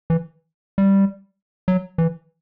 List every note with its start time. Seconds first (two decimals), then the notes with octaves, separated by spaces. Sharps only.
0.10 E3
0.78 G3
1.68 F#3
1.98 E3